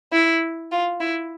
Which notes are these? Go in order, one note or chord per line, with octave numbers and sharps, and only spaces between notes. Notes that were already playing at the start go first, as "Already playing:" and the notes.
E4
F4
E4